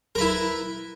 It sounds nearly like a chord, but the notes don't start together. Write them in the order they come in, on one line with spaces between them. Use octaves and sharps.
A#4 B4 E4